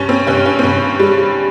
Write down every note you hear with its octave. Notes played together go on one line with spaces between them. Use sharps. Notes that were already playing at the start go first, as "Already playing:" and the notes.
Already playing: G2 C#4
C4
G2 C#4
C#4
C4
G2 C#4
G3